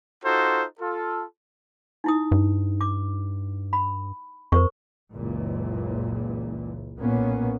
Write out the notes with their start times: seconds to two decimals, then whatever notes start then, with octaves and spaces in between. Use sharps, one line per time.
0.24 D#4 F4 F#4 A4 C5
0.80 F4 A4
2.04 D#4 E4 D#6
2.32 G2
2.81 D6
3.73 B5
4.52 F2 A#4 C5 C#6
5.13 F#1 C#2 A#2 E3
6.98 B1 A#2 A#3 B3 C#4